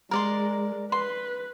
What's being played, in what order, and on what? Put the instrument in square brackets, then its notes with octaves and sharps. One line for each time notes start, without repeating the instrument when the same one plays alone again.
[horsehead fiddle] G#3 [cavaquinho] A#4 D5 C6
[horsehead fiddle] B4 [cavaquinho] C6